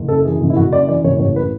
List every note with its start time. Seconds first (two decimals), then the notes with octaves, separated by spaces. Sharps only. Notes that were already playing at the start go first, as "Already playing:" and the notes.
Already playing: F#1
0.09 F#2 A4
0.25 E3 G#4
0.41 F#1
0.50 E4
0.56 F#1 F#4
0.72 F#2 D5
0.88 E3 D5
1.04 F#1 C#5
1.20 A1 C#5
1.36 B4